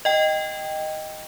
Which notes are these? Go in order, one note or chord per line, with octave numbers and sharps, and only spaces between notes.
D#5 G5